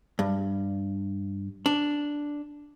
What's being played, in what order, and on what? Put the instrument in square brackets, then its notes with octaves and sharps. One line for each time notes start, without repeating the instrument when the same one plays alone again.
[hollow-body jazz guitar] G2
D4